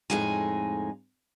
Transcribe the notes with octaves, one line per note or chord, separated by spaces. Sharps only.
F2 A2 G#3 D#4 G#5